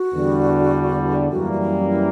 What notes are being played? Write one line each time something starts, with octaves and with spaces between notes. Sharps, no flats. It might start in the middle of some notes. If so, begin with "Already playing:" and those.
Already playing: F#4
E2 D3 G3
F#2 E3 G3 A#3 F#4
F#4
E4
E4